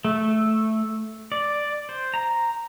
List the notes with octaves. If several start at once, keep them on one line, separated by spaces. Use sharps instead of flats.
A3
D5
C5
A#5